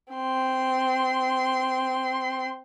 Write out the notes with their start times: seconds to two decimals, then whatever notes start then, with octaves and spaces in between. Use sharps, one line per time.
0.14 C4 C6